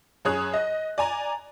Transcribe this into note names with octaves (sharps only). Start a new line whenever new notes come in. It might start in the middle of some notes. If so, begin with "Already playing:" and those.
F#2 G#4 C#5 D#6 F#6
D#5
D5 G#5 A#5